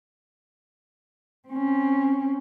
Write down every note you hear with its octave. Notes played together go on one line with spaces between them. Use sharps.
C4 C#4